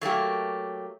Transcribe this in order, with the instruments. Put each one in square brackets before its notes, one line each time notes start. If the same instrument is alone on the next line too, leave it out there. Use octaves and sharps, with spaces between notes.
[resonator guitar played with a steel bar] F#3 A3 A#3 G4